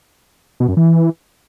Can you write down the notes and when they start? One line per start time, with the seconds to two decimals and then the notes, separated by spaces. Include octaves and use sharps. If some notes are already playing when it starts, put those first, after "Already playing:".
0.60 B2
0.69 F#2
0.77 E3